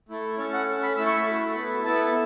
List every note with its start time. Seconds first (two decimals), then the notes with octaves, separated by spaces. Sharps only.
0.09 A3 E4 A4
0.38 C#4 A4 C#5
0.53 F#5
0.67 C#4 A4
0.82 B5
0.97 A3 E4 A4 E6
1.06 C#6
1.16 B5
1.26 A3 F#4 A4
1.55 B3 E4 A4
1.84 B3 E4 A4 A5